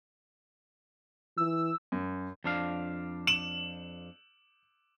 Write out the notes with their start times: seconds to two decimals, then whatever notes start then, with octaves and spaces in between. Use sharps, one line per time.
1.38 E3 E6
1.92 F#2
2.44 F2 D4 F5
3.27 E7 F#7